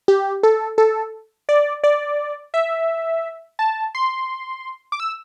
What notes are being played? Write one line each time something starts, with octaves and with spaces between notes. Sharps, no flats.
G4
A4
A4
D5
D5
E5
A5
C6
D6
E6